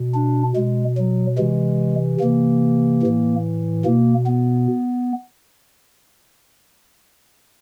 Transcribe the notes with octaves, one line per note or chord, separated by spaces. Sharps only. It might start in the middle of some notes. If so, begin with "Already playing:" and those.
Already playing: B2
D4
B2 G#3
F#3
C3 E3 G#3
C3 E3 A#3
A2 E3
B2 A#3
B3